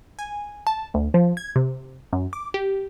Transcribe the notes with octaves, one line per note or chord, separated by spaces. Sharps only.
G#5
A5
D2
F3
G#6
C3
F#2
D6
G4